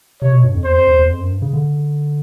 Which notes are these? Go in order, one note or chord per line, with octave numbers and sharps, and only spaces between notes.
C3 C#5
B2
G2
F2
E2 C5
F2
E2
E2
F2
F#2
G2
C#3
D3